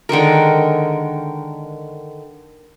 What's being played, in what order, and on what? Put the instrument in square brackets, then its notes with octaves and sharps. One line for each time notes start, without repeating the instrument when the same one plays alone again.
[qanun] D3 D#3 G#3 A#4